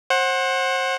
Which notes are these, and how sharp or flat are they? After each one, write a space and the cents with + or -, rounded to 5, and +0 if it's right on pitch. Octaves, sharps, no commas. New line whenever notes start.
C5 +30 F#5 +0